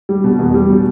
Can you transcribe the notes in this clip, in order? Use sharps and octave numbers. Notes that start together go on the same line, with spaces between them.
G3
B2
E2
G3
B2